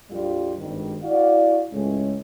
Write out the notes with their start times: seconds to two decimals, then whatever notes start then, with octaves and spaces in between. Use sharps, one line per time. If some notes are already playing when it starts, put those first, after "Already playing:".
0.10 A#1 F2 G3 F4
0.59 G#1 G2 D#3
1.03 E4 F#4 D5 F5
1.72 C#2 A2 G#3 C#4